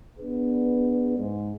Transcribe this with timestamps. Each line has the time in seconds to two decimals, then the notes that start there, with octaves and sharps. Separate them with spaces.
0.19 B3 D4 G#4 B4
1.18 G#2